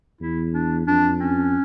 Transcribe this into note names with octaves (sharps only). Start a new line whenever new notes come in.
E2 E4
D4
F2 D4
C#4